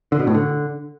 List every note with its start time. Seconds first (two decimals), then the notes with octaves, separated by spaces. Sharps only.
0.12 D3
0.20 B2
0.27 A2
0.35 D3